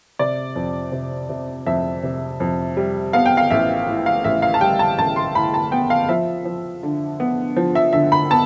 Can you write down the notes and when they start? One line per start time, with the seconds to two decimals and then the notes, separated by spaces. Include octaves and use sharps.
0.19 C3 D5
0.56 F2
0.92 C3
1.29 C3
1.66 F2 E5
2.03 C3
2.40 F2
2.77 G3
3.13 B3 F5
3.26 G5
3.37 F5
3.51 A1 E5
3.87 A2
4.06 F5
4.24 A1 E5
4.42 F5
4.54 A5
4.61 G3 G5
4.79 A5
4.98 A1 A5
5.16 C6
5.35 A2 B5
5.54 A5
5.72 B3 G5
5.90 F5
6.09 F3 E5
6.45 F3
6.83 D3
7.20 B3
7.56 F3
7.75 E5
7.93 D3 E5
8.12 B5
8.30 B3 A5